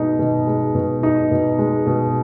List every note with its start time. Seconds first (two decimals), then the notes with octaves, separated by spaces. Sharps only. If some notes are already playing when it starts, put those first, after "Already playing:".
Already playing: B2 G#3 D#4
0.19 B2
0.47 G#3
0.75 B2
1.03 D#4
1.31 B2
1.59 G#3
1.87 B2